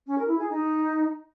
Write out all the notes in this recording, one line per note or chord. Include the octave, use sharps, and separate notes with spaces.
C#4
A#4
E4
G#4
D#4